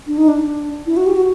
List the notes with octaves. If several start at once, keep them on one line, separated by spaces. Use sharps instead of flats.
D4
D#4
D4
E4
F#4
G4
F#4